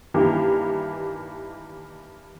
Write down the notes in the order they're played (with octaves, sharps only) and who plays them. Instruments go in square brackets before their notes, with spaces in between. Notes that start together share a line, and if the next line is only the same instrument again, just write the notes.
[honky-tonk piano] G2 D#3 E3 A#3 G4